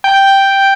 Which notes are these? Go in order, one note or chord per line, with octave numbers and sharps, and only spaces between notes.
G5